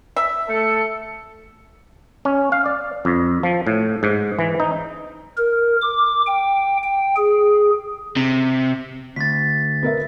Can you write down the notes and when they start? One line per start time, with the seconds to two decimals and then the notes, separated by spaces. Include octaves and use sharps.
0.16 E5
0.49 A3 A4 C#7
2.25 C#4
2.52 F5
2.66 D5
3.05 F2
3.43 F3
3.67 A2
4.03 G#2
4.39 E3
4.60 D#4
5.38 A#4
5.81 D6
6.27 G5
6.83 G5
7.17 G#4
8.16 C3
9.16 D2 A6 B6
9.83 B3 A#4 E5